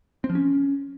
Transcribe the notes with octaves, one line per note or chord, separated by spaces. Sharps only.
C4
F3
C#4